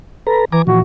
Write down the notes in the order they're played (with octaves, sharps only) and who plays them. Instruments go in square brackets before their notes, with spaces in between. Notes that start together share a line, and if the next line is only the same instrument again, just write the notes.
[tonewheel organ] A4 B4 A#5
[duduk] E3 [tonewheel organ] G#5 A#5 D6
[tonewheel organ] A#2 E3 F3 [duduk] F#4